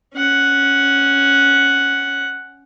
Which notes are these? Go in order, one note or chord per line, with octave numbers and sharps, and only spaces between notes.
C#4 F#5